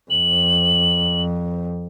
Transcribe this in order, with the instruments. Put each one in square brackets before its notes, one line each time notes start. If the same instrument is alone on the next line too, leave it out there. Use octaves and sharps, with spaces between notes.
[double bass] F2 [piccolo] F#7